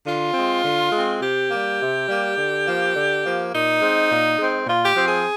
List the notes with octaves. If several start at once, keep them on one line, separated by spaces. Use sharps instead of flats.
D3 F4
G#3 C4
D3
G#3 C4
C3 G4
G3 A#3
C3
G3 A#3
D3
F3 A#3
D3
F3 A#3
A#2 D#4
G#3 C4
A#2
G#3 C4
A#2 F4
G4
F3 C4
G#4